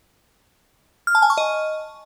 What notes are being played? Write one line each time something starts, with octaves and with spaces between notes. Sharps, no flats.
F6
A5
G#5
C#6
D#5